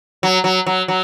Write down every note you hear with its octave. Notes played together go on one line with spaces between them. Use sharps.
F#3
F#3
F#3
F#3